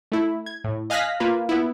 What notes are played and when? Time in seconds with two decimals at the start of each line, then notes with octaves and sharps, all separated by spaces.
0.12 A3 E4
0.46 G#6
0.64 A2
0.90 D#5 F5 G#5 F#6 A#6 B6
1.20 A#3 F4 B4
1.49 B3 E4